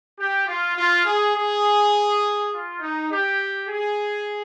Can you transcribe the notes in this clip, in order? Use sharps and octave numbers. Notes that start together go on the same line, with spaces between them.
G4
F4
F4
G#4
G#4
F4
D#4
G4
G#4